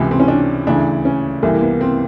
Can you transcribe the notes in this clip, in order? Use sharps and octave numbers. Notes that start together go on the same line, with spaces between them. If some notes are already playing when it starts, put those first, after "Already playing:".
Already playing: C#2 C3 E3 E4
C4
C#4
D4
D2 C#3 E3 D4
C#4
C2 C3 E3 A#3
A#3
B3
C4